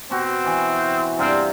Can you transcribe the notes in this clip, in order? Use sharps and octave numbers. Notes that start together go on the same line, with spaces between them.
B2 C4 F#4
E3
G2 C3 C4 F5